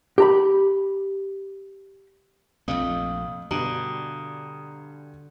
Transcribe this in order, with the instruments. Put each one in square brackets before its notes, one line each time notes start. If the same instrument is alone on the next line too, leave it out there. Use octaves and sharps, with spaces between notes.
[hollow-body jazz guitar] G4 A#5 B5
[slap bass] A#1 C3 A3 [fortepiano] F2 [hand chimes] F5 D#6
[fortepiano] G2 B2 [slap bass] D3 [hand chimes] A#5 D#6